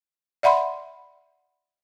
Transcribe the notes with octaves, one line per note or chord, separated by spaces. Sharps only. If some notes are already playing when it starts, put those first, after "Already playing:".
D5 E5 F#5 B5 C6